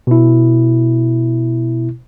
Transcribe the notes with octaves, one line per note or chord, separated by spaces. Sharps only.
B2 E4